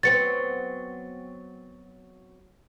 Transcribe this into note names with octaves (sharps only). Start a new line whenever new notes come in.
F#3 B3 C4 A6 C#7